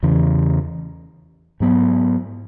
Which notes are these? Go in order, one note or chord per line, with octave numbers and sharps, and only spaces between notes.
E2 C#3 E3
G#2 F#3 B3